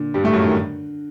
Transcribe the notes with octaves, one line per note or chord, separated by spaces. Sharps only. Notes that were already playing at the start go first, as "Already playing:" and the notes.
Already playing: A#2 D3
G2 G3
A2 A3
F#2 F#3
D#3